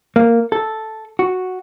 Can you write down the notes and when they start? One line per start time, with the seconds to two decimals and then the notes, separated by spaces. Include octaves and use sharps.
0.16 A#3
0.52 A4
1.19 F#4